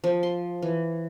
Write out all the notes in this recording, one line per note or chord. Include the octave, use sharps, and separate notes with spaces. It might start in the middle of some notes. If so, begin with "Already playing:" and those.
F3
C6
E3